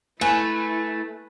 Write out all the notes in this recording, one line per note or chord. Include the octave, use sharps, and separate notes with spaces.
A3 E4 B4 G#5